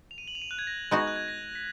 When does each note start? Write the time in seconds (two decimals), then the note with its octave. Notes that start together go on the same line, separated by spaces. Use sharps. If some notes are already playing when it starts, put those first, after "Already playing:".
0.11 F7
0.18 D#7
0.28 F#7
0.35 F7
0.42 D#7
0.51 F#6
0.59 G#6
0.67 A#6
0.91 G#3 B3 D#4 F#4 A#6
1.00 G#6
1.07 F#6
1.16 G#6
1.28 A#6
1.55 B6